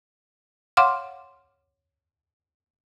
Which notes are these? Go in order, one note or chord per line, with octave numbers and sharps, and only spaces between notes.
C#5 F5 F#5 C6 D6 F6